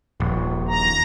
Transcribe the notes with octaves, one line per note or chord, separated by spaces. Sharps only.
D#1 A#1
A#5